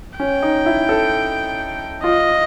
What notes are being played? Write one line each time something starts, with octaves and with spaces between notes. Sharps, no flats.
C#4 G5
D#4
E4
A4
F4 D#5